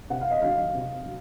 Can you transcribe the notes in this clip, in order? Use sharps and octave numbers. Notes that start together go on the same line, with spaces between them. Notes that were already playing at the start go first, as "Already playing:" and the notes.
C3 F#5
F5
D#5
D#3 F#3 F5
C3
F#3